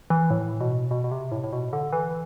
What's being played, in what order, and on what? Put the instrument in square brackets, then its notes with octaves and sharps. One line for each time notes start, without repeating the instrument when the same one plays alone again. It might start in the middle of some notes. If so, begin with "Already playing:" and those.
[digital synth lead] E3
A2
B2
B2
B2
C3
A2
A2
B2
D3
E3